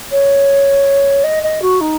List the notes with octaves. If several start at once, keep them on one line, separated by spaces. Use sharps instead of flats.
C#5
D#5
D#5
F#4
D#4